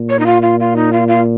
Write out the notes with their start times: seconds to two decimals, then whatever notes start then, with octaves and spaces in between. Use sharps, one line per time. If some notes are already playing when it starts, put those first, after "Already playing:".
Already playing: A#2
0.09 C#5
0.19 D#4
0.26 F4
0.42 F4
0.60 F4
0.76 D#4
0.93 F4
1.08 F4